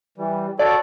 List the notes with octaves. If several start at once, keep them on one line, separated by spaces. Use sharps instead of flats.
E3 G3
F#4 A4 C#5 D5